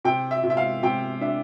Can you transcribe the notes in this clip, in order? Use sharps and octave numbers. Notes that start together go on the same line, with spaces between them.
C3 G5
E5
C3
E5
F5
C3 G5
D4 E5